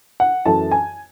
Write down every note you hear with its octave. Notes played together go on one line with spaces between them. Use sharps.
F#5
F#2 E3 A3 A5
G#5